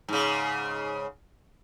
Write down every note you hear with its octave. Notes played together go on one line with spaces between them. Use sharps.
G#2 C#3